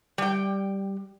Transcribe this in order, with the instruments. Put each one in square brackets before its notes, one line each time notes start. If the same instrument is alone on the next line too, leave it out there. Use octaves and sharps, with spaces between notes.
[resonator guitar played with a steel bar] G3 G5